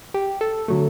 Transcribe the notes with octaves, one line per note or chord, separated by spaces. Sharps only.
G4
A4
D3 F#3 A3